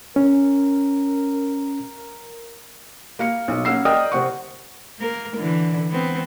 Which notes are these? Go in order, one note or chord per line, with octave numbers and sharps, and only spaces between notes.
C#4 A#4
A#3 F5 C#7
B1
A#3 C#4 F#5 E6 C7
A#4 D5 D#5 G5 D#6
C3 C4 F#5 C#6
A#3 A#4
D3 E3
B3 C4